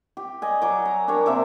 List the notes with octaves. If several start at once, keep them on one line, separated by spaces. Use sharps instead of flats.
G4
D5 D#5 G#5
F#3 D6
A#5
D4 G4 A#4 C#5
C3 A#3 E5 D6